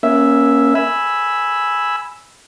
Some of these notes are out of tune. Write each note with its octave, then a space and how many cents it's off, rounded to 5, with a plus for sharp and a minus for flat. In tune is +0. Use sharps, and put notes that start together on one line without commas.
A#3 +25 C#4 +0 E5 +0
G#5 +0 B5 +0 E6 +0